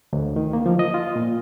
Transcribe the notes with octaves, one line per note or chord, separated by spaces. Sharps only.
D2
D#3
A#3
F3
D#5
F4
A#2